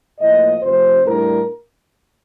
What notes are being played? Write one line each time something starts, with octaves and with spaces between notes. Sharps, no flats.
A2 F3 A#3 D#5
F2 C3 F3 A3 C5
A2 G3 D4 A#4